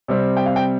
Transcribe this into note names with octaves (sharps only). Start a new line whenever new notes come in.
C3 G3 C4
G5
F5
G5